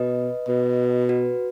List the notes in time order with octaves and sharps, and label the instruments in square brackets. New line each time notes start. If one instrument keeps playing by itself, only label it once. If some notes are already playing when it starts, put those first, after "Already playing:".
Already playing: [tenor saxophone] B2 [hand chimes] B4 D#5
[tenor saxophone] B2
[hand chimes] F#4 B4